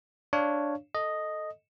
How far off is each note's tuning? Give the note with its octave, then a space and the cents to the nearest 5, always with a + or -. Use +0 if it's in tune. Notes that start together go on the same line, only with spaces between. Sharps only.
D4 +0 C#5 +0 F5 -15
A4 +0 D#5 +0